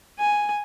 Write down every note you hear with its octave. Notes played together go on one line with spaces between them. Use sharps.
G#5